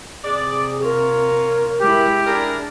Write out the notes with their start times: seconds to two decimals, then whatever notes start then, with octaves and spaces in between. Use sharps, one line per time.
0.24 C3 G#4 D5
0.83 A#3 F4 A#4 C#5
1.80 G#3 E4 G4
2.26 D4 E4 G#4 A#4